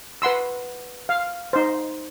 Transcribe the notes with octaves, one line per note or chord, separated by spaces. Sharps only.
B4 F#5 C6 E6
F5
D#4 C5